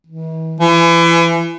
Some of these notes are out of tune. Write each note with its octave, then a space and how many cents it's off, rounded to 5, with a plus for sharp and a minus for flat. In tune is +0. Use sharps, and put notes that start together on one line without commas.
E3 -40
E3 +35